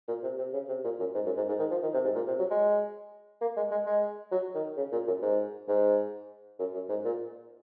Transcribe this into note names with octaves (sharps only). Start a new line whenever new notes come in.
A#2
C3
C3
C#3
C3
A#2
F#2
G#2
F#2
G#2
G#2
D#3
F3
D#3
C3
G#2
A#2
C3
F#3
G#3
A#3
G#3
G#3
G#3
F#3
D#3
C#3
A#2
F#2
G#2
G#2
F#2
F#2
G#2
A#2